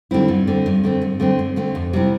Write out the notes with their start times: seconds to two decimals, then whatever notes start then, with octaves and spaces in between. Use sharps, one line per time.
0.11 D3 G3 C4 E4
0.28 G2
0.47 D3 A3 C4
0.66 G2
0.84 D3 A3 C4
1.02 G2
1.20 D3 A3 C4
1.39 G2
1.56 D3 A3 C4
1.75 F2
1.93 C3 G3 C4 E4